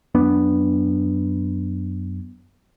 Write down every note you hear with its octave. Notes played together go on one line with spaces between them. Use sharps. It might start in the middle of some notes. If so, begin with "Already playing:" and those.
F#2 B3 D4